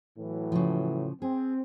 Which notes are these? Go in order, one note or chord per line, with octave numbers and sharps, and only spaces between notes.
A2 E3 F#3
C#3 F3
C4 G#4